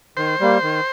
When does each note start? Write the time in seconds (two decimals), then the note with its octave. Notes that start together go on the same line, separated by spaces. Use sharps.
0.17 D#3 C5
0.40 G3 A#3
0.63 D#3